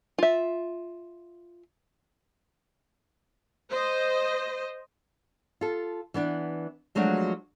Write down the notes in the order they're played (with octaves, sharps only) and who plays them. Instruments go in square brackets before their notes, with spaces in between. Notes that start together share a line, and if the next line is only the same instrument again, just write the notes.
[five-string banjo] F4 E5
[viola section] C5 D#5
[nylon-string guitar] F4 A4
E3 B3 D4
F3 F#3 G#3 A3 D4 F#4